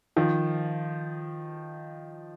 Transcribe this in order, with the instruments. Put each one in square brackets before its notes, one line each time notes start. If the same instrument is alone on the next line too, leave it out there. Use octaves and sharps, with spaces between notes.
[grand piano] D#3 F3